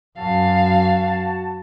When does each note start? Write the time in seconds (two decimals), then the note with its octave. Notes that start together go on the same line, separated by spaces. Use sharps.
0.18 F#2 F#4 F5 A5